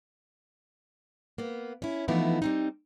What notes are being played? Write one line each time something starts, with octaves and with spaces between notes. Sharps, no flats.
A#3 B3
C#4 E4
E3 F3 A3 B3 D#4 E4
G3 C4 D#4